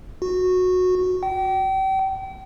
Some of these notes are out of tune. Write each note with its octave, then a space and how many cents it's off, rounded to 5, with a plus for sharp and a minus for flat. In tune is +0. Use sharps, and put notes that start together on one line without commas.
F#4 -15
G5 -35